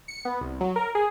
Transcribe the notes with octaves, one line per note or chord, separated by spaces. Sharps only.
C#7
B3
C2
F#3
A#4
G#4